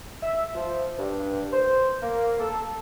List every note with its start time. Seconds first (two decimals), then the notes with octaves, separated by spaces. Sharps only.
0.23 E5
0.55 F3
0.98 G2
1.53 C5
2.03 A#3
2.40 A4